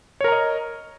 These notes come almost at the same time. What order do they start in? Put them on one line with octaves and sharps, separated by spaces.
C#5 A#4 A#5 D#5